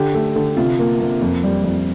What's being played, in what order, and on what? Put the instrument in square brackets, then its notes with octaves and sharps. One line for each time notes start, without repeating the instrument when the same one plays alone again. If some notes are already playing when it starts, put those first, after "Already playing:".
Already playing: [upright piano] D3 G4
A3
D3
C3 F4
A#3
A#3
F2
G3
F2